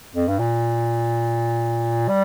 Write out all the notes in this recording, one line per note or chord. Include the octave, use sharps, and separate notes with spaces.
F2
G2
A#2
G3